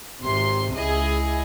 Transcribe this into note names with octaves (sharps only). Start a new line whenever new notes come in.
G#1 C3 C6
C#2 E4 G#4 D#5